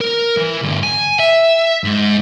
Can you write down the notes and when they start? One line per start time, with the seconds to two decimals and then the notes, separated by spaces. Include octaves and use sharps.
0.01 A#4
0.37 E3
0.62 D2 G2
0.83 G#5
1.19 E5
1.84 G#2